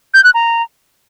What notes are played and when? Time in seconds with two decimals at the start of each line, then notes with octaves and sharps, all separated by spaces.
0.14 G6
0.24 F#6
0.34 A#5